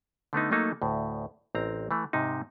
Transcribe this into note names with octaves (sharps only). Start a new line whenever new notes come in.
D3 A3 B3 D#4
F#3 A3 A#3 D#4 A4
D2 A2
A1 C4 A#5
E3 A3
G#2 C3 D#4